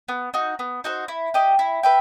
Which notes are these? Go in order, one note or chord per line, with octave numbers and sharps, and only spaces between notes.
B3
D#4 F#4
B3
D#4 F#4 C5
E4
G4 D#5
E4
B4 E5 G5